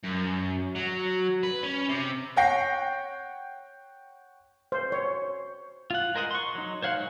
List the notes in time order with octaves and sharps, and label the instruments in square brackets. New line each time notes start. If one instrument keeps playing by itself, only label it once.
[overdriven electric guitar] F#2
F#3
B4
C#4
C3
[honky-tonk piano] C#5 F#5 G5 A#6 C7
[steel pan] C5
C#5
[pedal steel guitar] F4 F#5
G#3 A#4 C5 D#5 F#5
C6 C#6
F#3 D#4
C5 C#5 F5 F#5
F#3 G#3